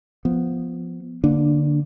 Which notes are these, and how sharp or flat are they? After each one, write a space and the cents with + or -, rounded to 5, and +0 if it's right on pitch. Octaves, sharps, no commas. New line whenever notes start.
F3 +0 B3 +0
D3 +0 A#3 +0 D4 +20